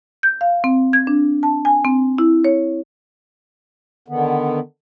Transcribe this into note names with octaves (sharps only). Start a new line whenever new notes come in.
G6
F5
C4
G#6
D4
A5
G#5
C4
E4
C#5
D3 D#3 B3